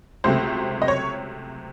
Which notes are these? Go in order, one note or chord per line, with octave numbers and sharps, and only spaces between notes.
C#2 C3 F#3 A3 C4 C5
D#5
C#5